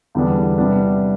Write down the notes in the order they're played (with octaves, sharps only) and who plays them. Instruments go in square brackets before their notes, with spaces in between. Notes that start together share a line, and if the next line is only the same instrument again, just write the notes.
[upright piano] E2 D3 G3 B3 D4
C3 G3 B3 D4